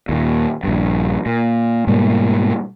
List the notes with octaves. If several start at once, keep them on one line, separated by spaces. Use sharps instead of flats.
D#2 A#2
A#1 G2
A#2
G#2 B2 G3 A#3